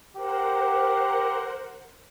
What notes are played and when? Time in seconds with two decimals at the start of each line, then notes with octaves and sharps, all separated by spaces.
0.16 G4 A#4 C5 F#5